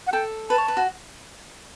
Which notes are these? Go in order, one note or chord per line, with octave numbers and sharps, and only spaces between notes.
F#5
A4 G5
B4 A5
C#5
B4
F#4